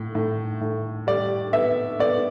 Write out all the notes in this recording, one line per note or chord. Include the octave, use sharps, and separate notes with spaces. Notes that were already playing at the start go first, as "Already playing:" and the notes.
Already playing: A2
A2
A2
G3 D5
B3 E5
B3 D5